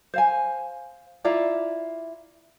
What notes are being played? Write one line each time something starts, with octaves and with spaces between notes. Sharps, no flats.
C5 F5 G#5
E4 F4 D5 A#5